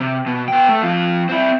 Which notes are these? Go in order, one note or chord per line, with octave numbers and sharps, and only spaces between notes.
C3
B2
B3 G5
A3
F2 F4
C4 E4